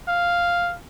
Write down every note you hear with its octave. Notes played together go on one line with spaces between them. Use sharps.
F5